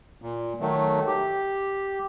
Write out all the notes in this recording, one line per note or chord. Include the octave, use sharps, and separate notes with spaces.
A#2
D#3 F#3 A3
G4